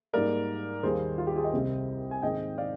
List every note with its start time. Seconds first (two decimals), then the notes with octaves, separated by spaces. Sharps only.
0.13 G#2 G3 A#3 A#4 D5
0.83 D#2 D#3 G3 A#3 G#4 C5
1.18 F4
1.27 G4
1.36 F4 G#4
1.44 D#5 G5
1.53 C2 C3 G3 C4
2.11 G#5
2.22 G#2 D#3 G#3 C4 D#5 G5
2.58 D5 F5